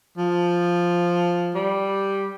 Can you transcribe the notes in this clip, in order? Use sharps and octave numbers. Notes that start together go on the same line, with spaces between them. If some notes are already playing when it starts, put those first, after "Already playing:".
F3
G3